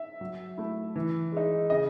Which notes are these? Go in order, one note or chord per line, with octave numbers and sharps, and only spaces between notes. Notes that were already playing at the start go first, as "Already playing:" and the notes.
Already playing: E5
F#3
A3 E4
E3
G#3 D#4
C#3 D#5